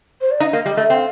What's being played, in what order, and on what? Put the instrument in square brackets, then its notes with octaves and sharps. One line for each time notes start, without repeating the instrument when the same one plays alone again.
[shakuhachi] C5
D5
[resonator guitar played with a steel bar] D#4 [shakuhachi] F5
[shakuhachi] D#5
[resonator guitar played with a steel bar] A#3
G3
A3
[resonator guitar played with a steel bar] C4 [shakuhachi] G5
[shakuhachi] F5